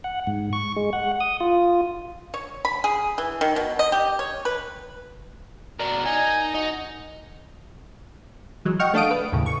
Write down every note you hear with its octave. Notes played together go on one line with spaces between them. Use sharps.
F#5
G#2
C#6
G#3
F#5
D#6
F4
C#5
B5
G#4
E3
D#3
B2
D#5
G4
C#5
B4
B2 D4 A#4
D#4 G#5
D#4 F#4
E3 F#3 G#3
D#5 F#5 G5 C#6 F6
A3 D4 A4 F5 D#6 D7
B4
D#2 A2 C#3
C#6